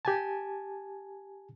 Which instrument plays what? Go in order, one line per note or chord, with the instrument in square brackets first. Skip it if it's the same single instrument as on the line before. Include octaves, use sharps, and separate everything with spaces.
[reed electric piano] G4 G#5 A5